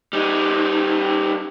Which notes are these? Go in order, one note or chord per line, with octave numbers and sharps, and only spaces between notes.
G3 D#4